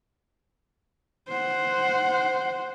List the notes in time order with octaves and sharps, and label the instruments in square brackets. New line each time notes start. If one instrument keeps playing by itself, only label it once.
[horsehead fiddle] C5 F#5